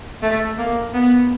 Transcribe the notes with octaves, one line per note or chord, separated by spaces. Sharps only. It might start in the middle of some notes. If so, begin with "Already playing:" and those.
A3
A#3
B3